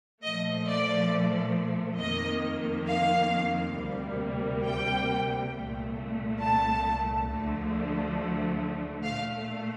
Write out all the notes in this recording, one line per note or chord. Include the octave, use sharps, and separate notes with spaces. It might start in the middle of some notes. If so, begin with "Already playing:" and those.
A#2 F3 A3 D#5
D5
F2 D#3 A#3 D#5
F5
D2 C3 G3 A#3
G5
C2 A#2 A3
A5
D2 D3 F3 A3
A#2 A3 F5